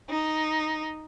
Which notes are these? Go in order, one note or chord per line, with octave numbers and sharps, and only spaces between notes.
D#4